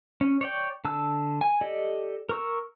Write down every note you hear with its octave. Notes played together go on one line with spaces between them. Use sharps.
C#4
C#5 D5 G5
D3 A5 E6
G#5
G4 A4 D5 D#5
A#4 C#6 E6